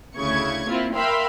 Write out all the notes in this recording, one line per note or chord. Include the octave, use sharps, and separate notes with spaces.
D2 C#3 E4 C#6 G#6
A#3 C4 E4 F4
A#4 E5 F5 G5 B5 C6